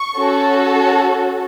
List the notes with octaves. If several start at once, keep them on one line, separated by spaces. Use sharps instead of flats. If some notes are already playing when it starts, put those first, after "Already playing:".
Already playing: C#6
C#4 F#4 A4